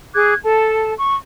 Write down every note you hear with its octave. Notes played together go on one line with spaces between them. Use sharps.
G#4 D6 F#6 G#6
A4 A5
C#6